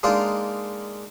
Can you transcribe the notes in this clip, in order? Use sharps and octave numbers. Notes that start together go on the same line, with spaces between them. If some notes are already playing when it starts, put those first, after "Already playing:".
G#3 A#3 D4 D#4 F4